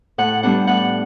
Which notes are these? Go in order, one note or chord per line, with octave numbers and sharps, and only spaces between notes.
A2 F#5
G3 B3 D4 F#5
A2 F#5